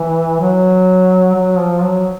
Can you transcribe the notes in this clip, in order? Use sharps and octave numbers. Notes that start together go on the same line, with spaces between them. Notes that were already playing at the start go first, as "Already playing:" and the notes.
Already playing: E3
F#3
F#3
F3
F#3